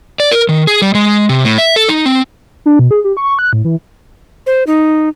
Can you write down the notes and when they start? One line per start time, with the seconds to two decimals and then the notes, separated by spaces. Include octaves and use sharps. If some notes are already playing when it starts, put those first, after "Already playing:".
0.20 D5
0.31 A#4
0.49 D#3
0.67 G#4
0.82 G3
0.95 G#3
1.29 C3
1.44 A2
1.58 E5
1.76 A4
1.89 D#4
2.06 C4
2.66 D4
2.79 B2
2.91 G#4
3.04 G4
3.17 C#6
3.39 F#6
3.53 A2
3.65 E3
4.46 C5
4.67 D#4